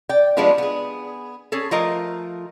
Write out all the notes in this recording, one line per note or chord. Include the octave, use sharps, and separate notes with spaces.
D5 G5
F3 G3 G#3 B3 D4 F4
B3 G#4
C#4 G#4 A4
F3 A3 F4 A#4 D#5 A#5